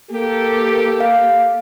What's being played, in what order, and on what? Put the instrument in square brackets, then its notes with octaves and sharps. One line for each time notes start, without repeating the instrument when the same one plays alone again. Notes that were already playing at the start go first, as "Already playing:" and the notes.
[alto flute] A#3 [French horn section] G4 A4
[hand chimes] F5